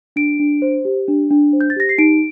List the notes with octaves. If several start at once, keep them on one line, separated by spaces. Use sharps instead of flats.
D4 D7
D4
C5
G4
D4
D4
C5
G6
A6
G4 A#6
C7
D#4 D7